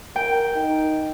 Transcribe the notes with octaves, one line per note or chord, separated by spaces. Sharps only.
A#4 G5
D#4